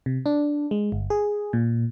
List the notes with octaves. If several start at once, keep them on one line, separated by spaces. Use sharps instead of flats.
C3
D4
G#3
G1
G#4
A#2